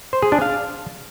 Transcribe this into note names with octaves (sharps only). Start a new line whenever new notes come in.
C5
G#4
D4
F5